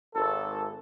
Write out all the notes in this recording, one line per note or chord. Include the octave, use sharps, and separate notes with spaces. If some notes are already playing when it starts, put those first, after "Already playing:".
G#1 A4